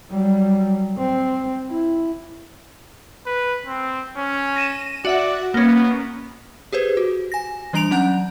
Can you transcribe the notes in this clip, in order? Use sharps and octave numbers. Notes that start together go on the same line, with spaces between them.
F#3 G3
C4
E4
B4
C4
C#4
A#6 D#7 E7
F#4 D5 E5 F#5
A#3 B3 C#4
G4 G#4 B4 C5
F#4
G#5 A#6
E3 G3 D4 A#5 D7 F7
F#3 C#4 F#5 F#6 G6